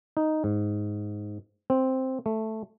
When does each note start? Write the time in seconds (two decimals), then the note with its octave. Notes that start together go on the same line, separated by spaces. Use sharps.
0.17 D#4
0.44 G#2
1.70 C4
2.26 A3